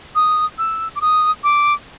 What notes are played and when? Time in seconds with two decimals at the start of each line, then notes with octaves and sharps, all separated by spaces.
0.15 D#6
0.58 E6
0.96 D6
1.01 D#6
1.44 D6